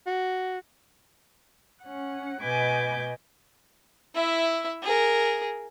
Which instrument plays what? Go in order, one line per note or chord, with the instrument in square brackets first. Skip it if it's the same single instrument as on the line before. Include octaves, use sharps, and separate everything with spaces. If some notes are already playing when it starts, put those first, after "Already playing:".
[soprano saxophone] F#4
[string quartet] C#4 F#5
B2 B4 D#5 G#5 D6 G6
[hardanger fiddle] E4 E5
G#4 A#4